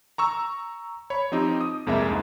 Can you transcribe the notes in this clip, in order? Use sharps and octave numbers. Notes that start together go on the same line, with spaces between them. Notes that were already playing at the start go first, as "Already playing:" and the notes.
A#5 C#6 E6
C#5 B5
F3 C4 D#4 G4
D#6
C2 F2 G#3 A#3 E5
C#2 G#2